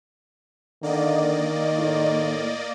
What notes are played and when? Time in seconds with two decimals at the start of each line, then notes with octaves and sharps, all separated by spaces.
0.83 D3 D#3 A#3 D5 D#5
1.78 A2